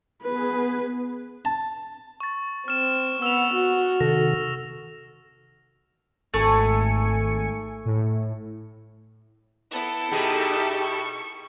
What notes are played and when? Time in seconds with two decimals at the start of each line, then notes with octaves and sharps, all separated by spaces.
0.22 B3 G#4 B4
1.45 A5
2.20 C#6 A6
2.68 C4 F6 E7
3.22 B3 E6 E7 F7
3.55 F#4
4.01 C3 D#3 A4 A#6
6.34 G#1 A3 G#5 C#7
7.85 A2
9.71 B3 E4 A4
10.12 B2 D#4 G4 G#4 E5
10.83 C#6